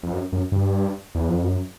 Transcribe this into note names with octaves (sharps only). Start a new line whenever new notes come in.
F2
F#2
F#2
G2
E2
F2
F#2